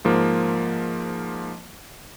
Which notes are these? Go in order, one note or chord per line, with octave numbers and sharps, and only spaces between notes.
G#2 F3 A#3